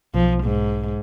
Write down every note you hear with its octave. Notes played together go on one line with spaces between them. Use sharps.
B1 F3
G#2